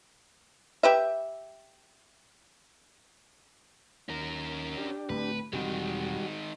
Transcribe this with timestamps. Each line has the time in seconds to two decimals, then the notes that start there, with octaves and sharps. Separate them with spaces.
0.83 G4 B4 E5
4.09 D#2 C#4 A#4
4.77 D4 G4
5.09 D1 A3 C4 B4
5.53 E1 D#3 G3 G#3 C4 F#4